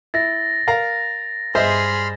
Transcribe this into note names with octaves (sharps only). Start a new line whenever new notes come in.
E4 A6 A#6
A#4 F5 A#5
G2 G#4 C5 D#5 E5 B5 C6 F6